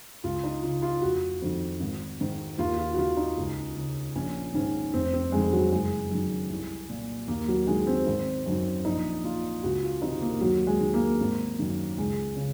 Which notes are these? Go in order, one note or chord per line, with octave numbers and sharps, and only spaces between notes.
C#2 F4
D#4
C#3 F4
F4
F1 F#4
F2 D#3
G#1
G#2 D#3
D#2 F4
F4
F#4
D#3 F4
D#4
C#2
C#3
A#1 C#4
G#2 D#3 C#4
F1 C4
C4
F2 D#3 G#3
F#3
F#1 G#3
F#2 D#3
C2
A#2
D#2 A#3
F#3
D#3 G#3
C4
G#1
F#2 D#3
A#1 D#4
A#2 F4
C#2 F#4
F4
C3 D#3 D#4
A#3
D#2 F#3
G#3
D#3
A#3
G#1
F#2 D#3
C#2 G#3
C#3